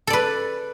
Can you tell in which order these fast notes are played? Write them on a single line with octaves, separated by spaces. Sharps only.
A4 D5 B4